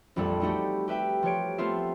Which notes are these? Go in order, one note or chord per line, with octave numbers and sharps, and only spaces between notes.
A#1 F2 G3 A3 A4 B5
G3 A3 D#4 F#4 G4
G4 B4 E5 G5
F3 G4 C#5 D7
A3 B3 C4 F4 C5 E5